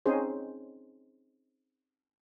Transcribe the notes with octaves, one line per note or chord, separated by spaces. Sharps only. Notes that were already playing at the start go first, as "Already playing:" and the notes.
C4 C#4 D#4 G#4 C5